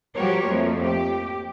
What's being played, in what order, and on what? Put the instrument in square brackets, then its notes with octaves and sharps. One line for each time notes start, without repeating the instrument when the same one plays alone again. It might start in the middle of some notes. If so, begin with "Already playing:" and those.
[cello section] F3 G3 F#4 G4 A#4 C#5
F2 F3 A3 A#3
G4